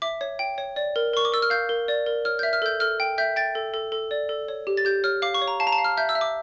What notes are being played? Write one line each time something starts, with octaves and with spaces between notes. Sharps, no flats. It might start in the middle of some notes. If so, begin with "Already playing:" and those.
E5 D6
C#5
G5
C#5
D5
A#4
A#4 C#6
D6
A#4 E6
F6
F5 G6
A#4
D5
A#4
C#5 F6
E5 G6
F6
A4 G6
A4 F6
G5
E5 G6
G5 A6
A4
A4
A4
D5
A4
C#5
G4
A6
G4 G6
C#5 F6
F5 D6
C#6
C#5
A#5
F5 A5
A#5
A5
F5
F6
E5 G6
E6
E5
D6